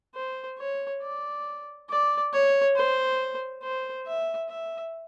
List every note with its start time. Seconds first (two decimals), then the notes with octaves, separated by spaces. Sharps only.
0.15 C5
0.58 C#5
1.03 D5
1.90 D5
2.33 C#5
2.76 C5
3.63 C5
4.06 E5
4.49 E5